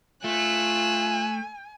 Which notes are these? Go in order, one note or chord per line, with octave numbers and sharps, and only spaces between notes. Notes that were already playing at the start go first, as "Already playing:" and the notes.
A3 F4 G#5 E6 F#6